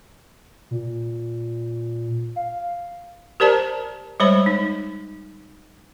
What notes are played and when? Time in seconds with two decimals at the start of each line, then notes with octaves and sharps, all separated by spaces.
0.71 A#2
2.36 F5
3.40 G4 A#4 C5 D5 A5 A#5
4.20 G3 G#3 C5 C#5 B5
4.46 D#4